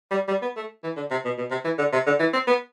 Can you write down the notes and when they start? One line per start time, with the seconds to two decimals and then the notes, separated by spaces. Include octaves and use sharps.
0.11 G3
0.28 G3
0.42 B3
0.56 A3
0.83 E3
0.96 D3
1.11 C3
1.25 B2
1.38 B2
1.51 C3
1.64 E3
1.78 D3
1.93 C3
2.06 D3
2.20 E3
2.33 C4
2.47 B3